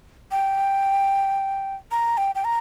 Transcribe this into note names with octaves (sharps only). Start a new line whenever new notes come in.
G5
A#5
G5
G5
A#5